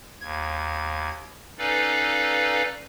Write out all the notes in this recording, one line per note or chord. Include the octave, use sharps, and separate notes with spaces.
D#2 G#6
C#4 D#4 A4 B4 D5 F5